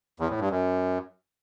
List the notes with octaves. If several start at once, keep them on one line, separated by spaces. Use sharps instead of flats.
E2
A2
G2
F#2